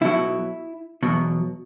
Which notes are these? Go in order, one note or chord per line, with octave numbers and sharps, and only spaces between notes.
B1 B2 F#3 E4
E2 B2 F#3